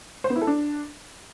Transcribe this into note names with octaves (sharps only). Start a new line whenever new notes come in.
C5
B3
E4
A4
D4